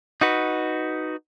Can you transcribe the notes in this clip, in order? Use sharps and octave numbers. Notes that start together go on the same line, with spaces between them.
D#4 F#4 B4